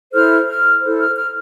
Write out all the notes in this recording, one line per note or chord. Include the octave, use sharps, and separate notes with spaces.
E4 A4 C5 F6
F6
E4 A4 C5
F6
F6